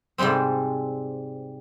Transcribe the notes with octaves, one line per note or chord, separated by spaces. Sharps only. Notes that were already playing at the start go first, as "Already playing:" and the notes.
G#2 C3 G3 G#3 C4